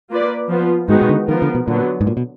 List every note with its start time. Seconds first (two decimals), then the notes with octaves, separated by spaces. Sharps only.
0.11 A#3 F4 B4 D5
0.49 F3 B3 F4
0.89 G#2 D#3 G#3 B3 D#4 F#4
1.02 B2
1.09 D3
1.28 D#3 F3 B3 F4 A#4
1.42 D3
1.55 B2
1.68 A#2 D3 F#3 B3
2.01 G#2
2.07 A#2
2.17 B2